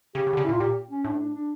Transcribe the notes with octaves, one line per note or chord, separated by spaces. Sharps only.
C#3 G4
C#3
D3
C#3
E4
A#2
F4
A#2 G4
C#4
A2 D4
D4
D4